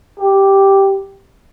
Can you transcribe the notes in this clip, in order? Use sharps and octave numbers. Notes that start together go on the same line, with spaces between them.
G4